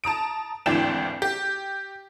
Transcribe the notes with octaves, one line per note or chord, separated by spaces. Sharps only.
A5 A#5 D#6 D7
G#1 D2 E3 D4 G5 E7
G4